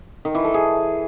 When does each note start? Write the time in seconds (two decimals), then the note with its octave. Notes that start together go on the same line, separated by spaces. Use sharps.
0.25 D#3
0.35 E3
0.44 A4
0.54 G#4